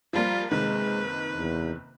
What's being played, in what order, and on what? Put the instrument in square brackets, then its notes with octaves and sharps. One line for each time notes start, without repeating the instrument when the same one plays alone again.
[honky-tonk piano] F3 G3 A#3 [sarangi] F4
[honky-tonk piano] F#1 C3 D#3 [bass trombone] G#3 [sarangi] B4
[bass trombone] E2